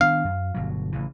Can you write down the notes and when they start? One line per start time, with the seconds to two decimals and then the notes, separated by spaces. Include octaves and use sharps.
0.01 D#3 B3 D4 F5
0.24 F#2
0.54 G1 B2 F#3
0.92 A1 C#3 E3